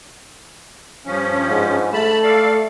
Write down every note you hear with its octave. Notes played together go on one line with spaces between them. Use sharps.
G2 F3 C#4
G#2
A3 A5 B5
A4 D5 F5